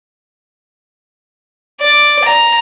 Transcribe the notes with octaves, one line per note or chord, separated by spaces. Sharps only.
D5
A#5